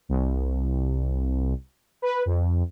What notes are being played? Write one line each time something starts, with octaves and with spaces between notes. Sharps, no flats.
C2
B4
F2